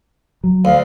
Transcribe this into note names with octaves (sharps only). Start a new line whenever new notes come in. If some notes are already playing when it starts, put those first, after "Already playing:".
F#3
D2 F5